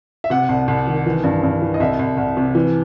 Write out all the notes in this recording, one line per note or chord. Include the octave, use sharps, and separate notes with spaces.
E5
C3 F#5
C2
C2
D#3
E3
G2
G2
E3
D#5
C2 E5
C2
C2
C3
E3